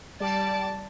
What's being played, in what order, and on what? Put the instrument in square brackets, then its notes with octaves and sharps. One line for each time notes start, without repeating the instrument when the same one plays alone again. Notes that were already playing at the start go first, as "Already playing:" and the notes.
[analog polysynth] G3 D5 [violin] A5 D7